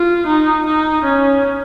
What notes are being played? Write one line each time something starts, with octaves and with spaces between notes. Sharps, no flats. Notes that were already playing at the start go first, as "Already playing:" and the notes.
Already playing: F4
D#4
D#4
C#4